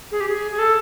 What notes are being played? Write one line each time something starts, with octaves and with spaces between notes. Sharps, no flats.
G#4
G4
G#4
G#4
A4